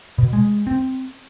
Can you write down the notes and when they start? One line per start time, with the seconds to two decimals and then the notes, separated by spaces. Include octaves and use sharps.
0.18 B2
0.33 G#3
0.67 C4